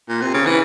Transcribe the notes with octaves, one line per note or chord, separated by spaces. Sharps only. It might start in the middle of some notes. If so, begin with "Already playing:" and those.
A#2
C3
C#3
E3